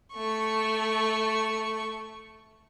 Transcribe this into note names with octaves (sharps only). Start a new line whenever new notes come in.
A3 C#6